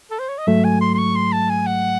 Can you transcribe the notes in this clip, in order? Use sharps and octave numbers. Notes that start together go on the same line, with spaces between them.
A4
C5
C#5
D#5
G#2 F#3 A3 E5
G#5
C6
C6
C#6
C6
A5
G#5
F#5